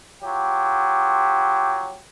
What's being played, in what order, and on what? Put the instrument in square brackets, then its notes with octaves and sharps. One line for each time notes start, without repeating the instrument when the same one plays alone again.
[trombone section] F#3 F4 G4